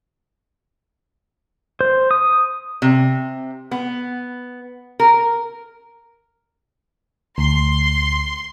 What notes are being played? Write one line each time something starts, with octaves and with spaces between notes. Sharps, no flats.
C5
D#6
C3
B3
A#4
D2 C6